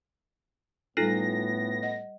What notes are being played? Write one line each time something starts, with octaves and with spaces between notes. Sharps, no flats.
A2 G3 B3 D#4 F4 A4 A#6 C7
D#5 F#5